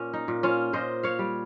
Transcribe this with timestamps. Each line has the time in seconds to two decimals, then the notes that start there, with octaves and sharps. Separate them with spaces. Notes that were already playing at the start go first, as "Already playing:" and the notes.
Already playing: A#2 C#4
0.13 D#4
0.28 A#2
0.43 C#4 F4
0.73 A#2 C5 D#5
1.03 C#5 F5
1.19 G3